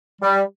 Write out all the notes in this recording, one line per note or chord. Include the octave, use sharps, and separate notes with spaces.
G3